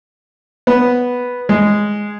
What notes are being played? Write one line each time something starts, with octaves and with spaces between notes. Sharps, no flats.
B3
G#3